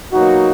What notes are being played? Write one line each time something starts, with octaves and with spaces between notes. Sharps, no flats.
B2 F#3 A#3 D#4 F#4